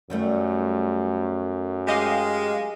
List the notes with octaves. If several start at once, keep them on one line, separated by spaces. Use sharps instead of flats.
F#2 D#3 G3 A3
G#3 G4 D#5 F5